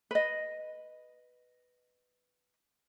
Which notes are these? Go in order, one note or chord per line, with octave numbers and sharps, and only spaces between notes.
B4 D#5